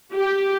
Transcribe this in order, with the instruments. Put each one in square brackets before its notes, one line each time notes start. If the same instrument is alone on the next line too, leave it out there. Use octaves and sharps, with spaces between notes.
[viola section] G4